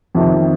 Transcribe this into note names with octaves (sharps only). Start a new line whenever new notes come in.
F2 C3 D#3